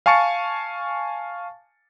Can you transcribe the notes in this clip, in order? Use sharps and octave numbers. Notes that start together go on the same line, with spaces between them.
F5 G#5 A5 C#6 A6 C#7